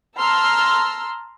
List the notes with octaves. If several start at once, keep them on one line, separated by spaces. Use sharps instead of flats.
A5 A#5 C6 E6 F6